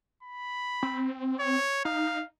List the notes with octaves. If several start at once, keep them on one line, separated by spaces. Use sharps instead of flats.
B5
C4
C#5
D#4 F5